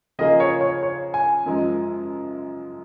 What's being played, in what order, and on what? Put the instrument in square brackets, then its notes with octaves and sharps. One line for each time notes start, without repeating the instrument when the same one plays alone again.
[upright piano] C#3 F3 A#3 F4 G#4 [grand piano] D#5
[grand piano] C#5
C#5
C#5
G#5
[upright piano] F#2 F3 G#3